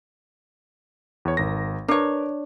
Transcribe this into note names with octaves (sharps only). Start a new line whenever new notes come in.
E2 C#5
G#1 A#4 A#6
D4 A#4 B4 C#5